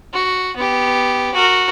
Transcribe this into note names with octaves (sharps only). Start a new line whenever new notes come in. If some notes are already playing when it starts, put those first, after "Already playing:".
F#4
B3 G4
F#4 A#4